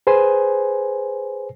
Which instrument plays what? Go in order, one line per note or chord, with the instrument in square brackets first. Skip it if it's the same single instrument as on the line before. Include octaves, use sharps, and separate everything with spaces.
[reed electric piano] G#4 B4 C5 G#5